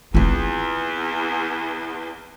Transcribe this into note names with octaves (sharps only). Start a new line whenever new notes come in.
E2 C4 F4